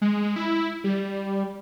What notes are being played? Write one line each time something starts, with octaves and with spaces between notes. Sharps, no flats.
G#3
E4
G3